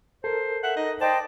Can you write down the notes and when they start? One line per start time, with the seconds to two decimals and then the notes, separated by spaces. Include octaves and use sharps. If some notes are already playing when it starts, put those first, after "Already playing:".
0.24 A4 A#4 C5
0.63 E5 F#5
0.77 D#4 D#5
1.01 C5 D5 D#5 G5 A5